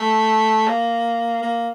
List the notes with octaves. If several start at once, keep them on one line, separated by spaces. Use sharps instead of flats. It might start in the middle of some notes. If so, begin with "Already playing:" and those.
Already playing: A3
A#3
A#3